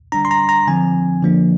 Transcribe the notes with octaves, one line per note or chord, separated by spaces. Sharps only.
D3 G3 D4 A#5
C6
A#5
A#5
D3 F3 C4 G#5
D3 F3 A#3 D4